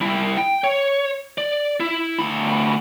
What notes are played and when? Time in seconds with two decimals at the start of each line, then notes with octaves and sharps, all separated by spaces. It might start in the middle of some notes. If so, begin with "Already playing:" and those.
0.01 G3 E4
0.37 G5
0.64 C#5
1.38 D5
1.80 E4
2.19 D2 B5